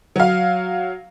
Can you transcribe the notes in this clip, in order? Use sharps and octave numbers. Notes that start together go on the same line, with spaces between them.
F#3 F5